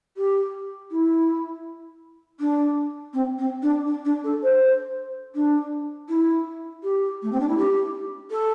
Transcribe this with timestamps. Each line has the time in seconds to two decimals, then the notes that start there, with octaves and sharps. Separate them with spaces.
0.17 G4
0.91 E4
2.40 D4
3.13 C4
3.38 C4
3.62 D4
3.87 D4
4.05 D4
4.24 A4
4.43 C5
5.35 D4
6.09 E4
6.83 G4
7.22 A3
7.32 C4
7.40 D4
7.48 E4
7.57 G4
8.31 A4